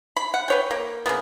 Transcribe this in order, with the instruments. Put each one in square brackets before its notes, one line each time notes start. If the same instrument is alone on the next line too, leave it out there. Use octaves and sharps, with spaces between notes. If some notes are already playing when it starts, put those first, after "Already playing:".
[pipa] B5
F#5
B4 C#5 G5
A#3
C#3 F#3 A#3 B3